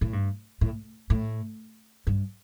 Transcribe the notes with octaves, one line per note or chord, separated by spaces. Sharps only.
A2
G2
A2
A2
G2